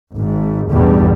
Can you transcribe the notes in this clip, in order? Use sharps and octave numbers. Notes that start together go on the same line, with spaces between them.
G#1 G#2
A1 E2 G2 B2 G3